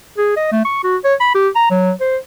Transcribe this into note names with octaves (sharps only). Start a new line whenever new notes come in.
G#4
D#5
A3
C#6
F#4
C#5
B5
G4
A#5
F#3
C5